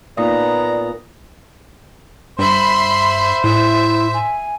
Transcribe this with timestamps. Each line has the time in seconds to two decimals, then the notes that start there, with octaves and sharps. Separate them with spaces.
0.17 A#2 B3 D#4 D5 A#5
2.39 G2 C5 E5 B5 C6
3.44 A2 E4 E5
4.14 G#5